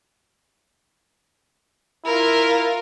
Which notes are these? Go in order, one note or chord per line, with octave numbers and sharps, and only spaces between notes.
E4 F4 A#4